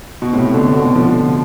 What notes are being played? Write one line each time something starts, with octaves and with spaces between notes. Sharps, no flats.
B2
A2 C3
B2 D3
B2 D3
D3 F3